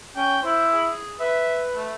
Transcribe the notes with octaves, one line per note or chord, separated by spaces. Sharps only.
C#4 G5
E4 C5
G#4
B4 E5
A3